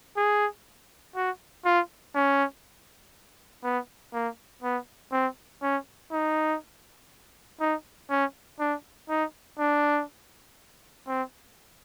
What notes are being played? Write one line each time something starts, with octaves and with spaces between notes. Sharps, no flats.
G#4
F#4
F4
C#4
B3
A#3
B3
C4
C#4
D#4
D#4
C#4
D4
D#4
D4
C4